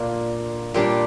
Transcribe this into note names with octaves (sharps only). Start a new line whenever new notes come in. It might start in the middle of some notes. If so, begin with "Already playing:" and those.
Already playing: A#2 A#3 D4 F4
A#2 G3 D4